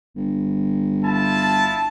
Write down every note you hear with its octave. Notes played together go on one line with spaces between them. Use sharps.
G1
E4 F4 A5